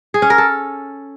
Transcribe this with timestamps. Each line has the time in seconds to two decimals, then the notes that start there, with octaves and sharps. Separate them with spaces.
0.14 G#4
0.22 C#4
0.30 A#4
0.38 A4